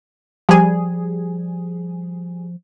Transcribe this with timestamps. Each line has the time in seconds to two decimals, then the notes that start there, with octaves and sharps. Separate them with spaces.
0.49 F3 G3 G#4